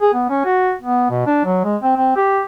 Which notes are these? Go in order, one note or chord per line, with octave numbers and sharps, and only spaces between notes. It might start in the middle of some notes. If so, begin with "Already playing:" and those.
G#4
B3
C#4
F#4
B3
B2
D4
F#3
G#3
C4
C4
G4